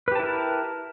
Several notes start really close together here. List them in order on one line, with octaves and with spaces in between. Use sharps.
B4 G4 A5 E4 A#4